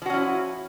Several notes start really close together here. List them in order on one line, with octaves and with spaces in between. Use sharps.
F3 F#4 C#4 E4